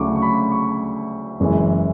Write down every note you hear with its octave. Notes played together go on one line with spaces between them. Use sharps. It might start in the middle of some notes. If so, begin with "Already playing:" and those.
Already playing: D2 C#3 F#3 A3 E4 C#6 D6
C#6
B5
C#6
F#1 F#2 E3 G#3